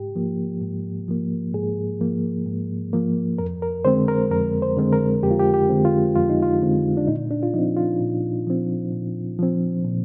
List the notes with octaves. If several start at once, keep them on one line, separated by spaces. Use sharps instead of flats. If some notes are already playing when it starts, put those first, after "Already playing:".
Already playing: G#2 G4
F3 A#3
G#2
F3 A#3
G#2 G#4
F3 A#3
G#2
F3 A#3
F2 A#4
A#4
D3 G#3 C4 C5
A#4
F2 A#4
C5
D3 G#3 C4
A#4
F2 G4
F4
G4
G4
D3 G#3 C4
F4
F2 F4
D#4
F4
D3 G#3 C4
D4
A#2 D#4
D4
F4
F3 C4 D#4
F4
A#2
F3 C4
A#2
F3 C4
A#2